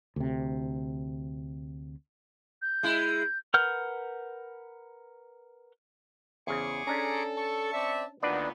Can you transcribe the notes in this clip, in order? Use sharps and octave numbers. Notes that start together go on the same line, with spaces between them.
D2 C3
G6
G#3 E4
A#4 B4 F#5 F6 G6
E2 C#3 G#4 C5 C#6 D6
C#4 D4 A4 A#5
A5 C#6
C4 D5 E5
D2 A#2 D#3 B3 D4 F#4 B4 D5